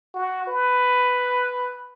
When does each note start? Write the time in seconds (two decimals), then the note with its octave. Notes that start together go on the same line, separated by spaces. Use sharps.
0.14 F#4
0.47 B4